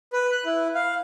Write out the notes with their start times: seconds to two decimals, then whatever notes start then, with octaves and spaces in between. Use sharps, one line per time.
0.13 B4
0.32 F#6
0.45 E4
0.75 F5